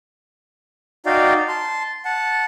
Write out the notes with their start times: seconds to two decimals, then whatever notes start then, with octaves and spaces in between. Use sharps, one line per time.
1.06 D#4 F#4 D5 F5 G5
1.48 A5 C6
2.05 F#5 A5